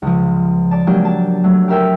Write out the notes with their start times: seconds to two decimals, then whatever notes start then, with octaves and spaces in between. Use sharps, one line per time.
0.02 C#2 F3
0.71 D5 A5
0.87 F#3 G#3 A#3 D4 G4
1.05 A5
1.44 F#3 A3
1.68 G4 A#4 E5 G5